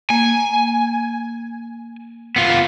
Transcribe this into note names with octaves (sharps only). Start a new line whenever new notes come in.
A#3 G#5
B3 F4